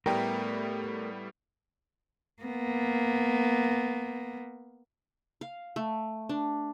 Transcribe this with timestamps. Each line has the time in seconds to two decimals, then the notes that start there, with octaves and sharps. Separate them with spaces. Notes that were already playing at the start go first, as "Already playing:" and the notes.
0.06 A2 G3 A3 B3 A#4 G5
2.42 A#3 B3
5.41 F5
5.76 A3
6.29 D4